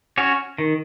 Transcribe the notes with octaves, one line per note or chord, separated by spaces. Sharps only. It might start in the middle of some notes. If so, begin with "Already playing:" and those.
C#4 F#4 C#5
D#3